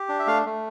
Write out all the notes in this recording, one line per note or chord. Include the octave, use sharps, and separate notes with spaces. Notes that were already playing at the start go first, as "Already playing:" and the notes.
Already playing: G4
D4
E5
A3 F5
A3